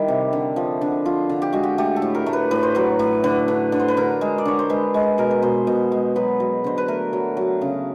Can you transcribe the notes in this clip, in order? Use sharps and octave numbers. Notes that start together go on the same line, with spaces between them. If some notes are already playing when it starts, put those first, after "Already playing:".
Already playing: D#3 G3 E4
C3
D3
F3
D3
F3 F4
D3
G4
G#3 F#4
G4
A3 G4
A4
A2
A#4
A3
B4
A2 B4
C5
F#3 B4
A2
D3 B4
D3
D3
C5
B4
D3 A#4
G#3
D5
D3 C#5
C5
G#3 B4
G#3
B2 A#4
B4
B2 C5
B2
G#3
F#3 B4
F#3
D3 C5
B4
A3 A#4
F#3
F#3
C#3